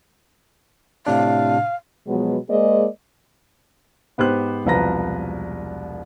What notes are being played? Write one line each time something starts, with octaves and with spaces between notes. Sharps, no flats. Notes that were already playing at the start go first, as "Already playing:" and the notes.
A2 C3 D4 F5
B2 F3 F#3 G#3 B3
G#3 A#3 G#4 C5 D5 D#5
G#2 B3 G4 C5 F#6
E1 C2 F3 B4 A#5 A#6